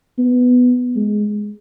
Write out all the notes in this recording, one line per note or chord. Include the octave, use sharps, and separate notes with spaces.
B3
G#3